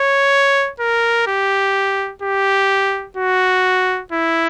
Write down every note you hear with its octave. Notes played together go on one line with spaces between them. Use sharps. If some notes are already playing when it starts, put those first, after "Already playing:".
Already playing: C#5
A#4
G4
G4
F#4
E4